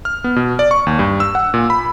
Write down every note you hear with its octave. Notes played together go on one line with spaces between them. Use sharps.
F6
B3
B2
D5
C#6
D#2
G2
E6
F#5
A#2
B5